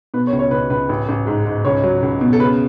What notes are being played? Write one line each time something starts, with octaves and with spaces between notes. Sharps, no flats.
B2 B4
C#5
C#2
C#5
C#2 B4
C#2 B4
A1
A1
G#2
G#2
C#2 C#5
F#3
C#2
B2
A4
C#3 B4